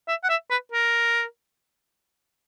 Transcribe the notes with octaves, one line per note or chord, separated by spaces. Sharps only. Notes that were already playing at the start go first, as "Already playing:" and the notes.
E5
F#5
E5
B4
A#4